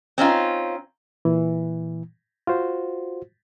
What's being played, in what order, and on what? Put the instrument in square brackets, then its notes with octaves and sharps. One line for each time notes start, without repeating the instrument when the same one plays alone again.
[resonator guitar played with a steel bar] C4 C#4 D#4 F4
[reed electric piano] A#2 E3
F4 F#4 C5